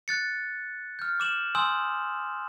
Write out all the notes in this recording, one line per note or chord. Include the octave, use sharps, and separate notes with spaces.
F#6 A6 C#7
F6 G6
D6 E7 F#7
G#5 C6 D#6 E6 G6 F#7